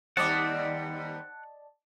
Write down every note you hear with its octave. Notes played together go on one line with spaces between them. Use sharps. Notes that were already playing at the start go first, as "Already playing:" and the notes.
D#2 G3 C4 D5 D#5 F#5 A5